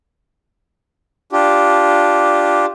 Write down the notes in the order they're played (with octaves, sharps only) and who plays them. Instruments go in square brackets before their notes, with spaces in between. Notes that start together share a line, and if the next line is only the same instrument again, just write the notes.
[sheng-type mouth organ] D4 F4 G4